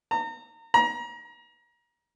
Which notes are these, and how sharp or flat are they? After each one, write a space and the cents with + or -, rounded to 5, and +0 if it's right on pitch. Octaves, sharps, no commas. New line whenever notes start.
A#5 -35
A#5 +30